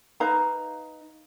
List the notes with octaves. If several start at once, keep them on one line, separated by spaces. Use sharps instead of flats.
D#4 B4 F5 A#5